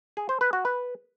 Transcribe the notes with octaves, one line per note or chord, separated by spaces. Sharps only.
G#4
C5
B4
F#4
B4